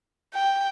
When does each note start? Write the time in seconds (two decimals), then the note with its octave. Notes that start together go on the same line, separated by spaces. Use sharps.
0.34 G5